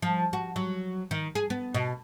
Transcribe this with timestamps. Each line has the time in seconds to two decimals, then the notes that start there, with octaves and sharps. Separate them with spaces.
0.02 F3
0.33 F#4
0.56 F#3
1.11 D#3
1.35 G#4
1.50 B3
1.74 B2